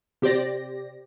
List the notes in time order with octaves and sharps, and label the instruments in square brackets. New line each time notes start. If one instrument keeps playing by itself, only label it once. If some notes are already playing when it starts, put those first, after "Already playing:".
[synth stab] C3 G4 C5 D5 A#6